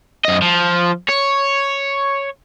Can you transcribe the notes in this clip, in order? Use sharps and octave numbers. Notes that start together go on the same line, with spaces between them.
F#2 D#5
F3
C#5